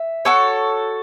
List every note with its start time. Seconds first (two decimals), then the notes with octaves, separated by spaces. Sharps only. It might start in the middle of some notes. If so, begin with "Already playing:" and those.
Already playing: E5
0.25 F#4 A4 C#5